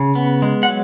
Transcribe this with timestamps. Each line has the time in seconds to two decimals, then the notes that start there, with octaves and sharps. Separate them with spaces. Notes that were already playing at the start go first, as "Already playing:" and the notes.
Already playing: C#3
0.15 B3
0.42 G#3
0.63 F#5
0.68 F#3